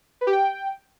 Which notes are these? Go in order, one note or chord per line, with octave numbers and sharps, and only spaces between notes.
B4
G4
G5